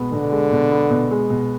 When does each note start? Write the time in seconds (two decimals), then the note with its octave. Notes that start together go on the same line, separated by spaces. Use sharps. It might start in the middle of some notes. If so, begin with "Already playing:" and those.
Already playing: B2 G#3 B3
0.13 B2 D3
0.32 G#3
0.51 B2
0.71 B3
0.90 B2
1.11 G#3
1.30 B2